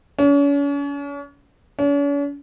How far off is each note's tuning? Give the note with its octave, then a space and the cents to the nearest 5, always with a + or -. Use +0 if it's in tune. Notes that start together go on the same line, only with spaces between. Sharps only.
C#4 +40
C#4 +45